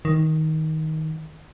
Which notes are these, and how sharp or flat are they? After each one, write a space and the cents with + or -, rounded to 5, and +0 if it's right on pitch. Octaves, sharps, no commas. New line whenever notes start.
D#3 +15